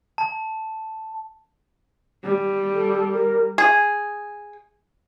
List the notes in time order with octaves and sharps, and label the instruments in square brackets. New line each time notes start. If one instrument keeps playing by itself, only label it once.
[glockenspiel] A5
[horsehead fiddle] G3
[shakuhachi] A4
A#4
[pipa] G#4